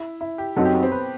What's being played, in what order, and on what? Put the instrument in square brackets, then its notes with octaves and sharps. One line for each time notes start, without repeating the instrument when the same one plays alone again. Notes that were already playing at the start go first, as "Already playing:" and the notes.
Already playing: [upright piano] E4
E4
G4
[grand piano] F#2 F#3 C4 D#4 F#4 [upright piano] A4
[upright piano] G4
B3
C4
B4